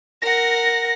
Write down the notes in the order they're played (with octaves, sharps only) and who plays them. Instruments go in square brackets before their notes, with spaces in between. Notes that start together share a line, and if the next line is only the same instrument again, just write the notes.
[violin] A#4 F#5 [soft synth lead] A#6